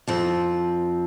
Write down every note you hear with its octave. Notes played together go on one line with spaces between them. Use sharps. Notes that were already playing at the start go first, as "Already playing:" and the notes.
F2 F3 C4